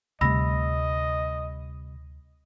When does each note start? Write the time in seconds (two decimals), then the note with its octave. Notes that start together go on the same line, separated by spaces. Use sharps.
0.21 D2 C3 G3 A3 D#5 B5 E6 A#6